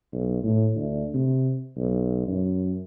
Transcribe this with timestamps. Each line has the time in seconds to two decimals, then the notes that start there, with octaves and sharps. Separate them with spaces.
0.13 B1
0.44 A2
0.76 D2
1.14 C3
1.77 B1
2.27 F#2